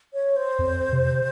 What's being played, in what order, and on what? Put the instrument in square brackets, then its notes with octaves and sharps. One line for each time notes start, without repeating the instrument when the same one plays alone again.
[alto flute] C#5
C5
[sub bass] F2
C3